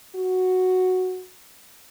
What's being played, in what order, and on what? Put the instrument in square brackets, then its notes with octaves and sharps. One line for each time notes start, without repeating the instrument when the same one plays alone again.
[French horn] F#4